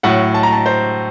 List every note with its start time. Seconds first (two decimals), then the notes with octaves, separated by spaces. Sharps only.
0.03 A2 F#3 F#5
0.34 A5
0.43 A#5
0.52 A5
0.66 C5